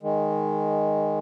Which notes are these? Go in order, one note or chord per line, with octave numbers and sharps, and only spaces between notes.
D#3 G#3